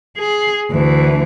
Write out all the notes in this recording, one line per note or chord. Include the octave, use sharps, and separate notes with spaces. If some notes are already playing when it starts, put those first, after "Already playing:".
G#4
D2 E3